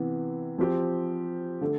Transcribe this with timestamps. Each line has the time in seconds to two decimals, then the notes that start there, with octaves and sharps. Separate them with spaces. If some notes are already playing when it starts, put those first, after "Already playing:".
Already playing: C3 E3 B3
0.58 F3 C4 G4
1.61 D3 A3